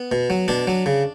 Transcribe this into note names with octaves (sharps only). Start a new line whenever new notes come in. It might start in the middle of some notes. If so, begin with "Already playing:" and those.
Already playing: B3
B2
F#3
B2 D4
F#3
C#3